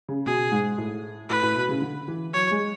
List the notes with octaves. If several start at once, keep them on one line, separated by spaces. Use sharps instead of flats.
C#3
B2 G#4
G#2
A2
A2 B4
A2
B2
C#3
D3
E3
F#3 C#5
G#3